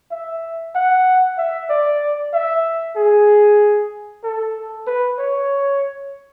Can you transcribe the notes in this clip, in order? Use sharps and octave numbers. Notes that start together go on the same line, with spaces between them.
E5
F#5
E5
D5
E5
G#4
A4
B4
C#5